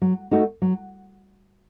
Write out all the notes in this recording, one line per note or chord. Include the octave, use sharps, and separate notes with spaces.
F#3
A3 D#4 F#4
F#3